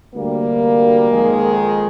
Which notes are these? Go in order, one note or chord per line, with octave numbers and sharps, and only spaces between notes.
D2 C3 G3 A#3
F2 D#3 G#3